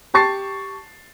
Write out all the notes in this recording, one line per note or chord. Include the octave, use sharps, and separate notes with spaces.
G4 A5 C#6 A6 C7